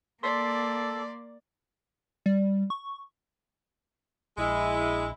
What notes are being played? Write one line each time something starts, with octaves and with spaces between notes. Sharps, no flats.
A#3 A4 D5 C6 B6 C7
G3
C#6
A#1 G#3 E4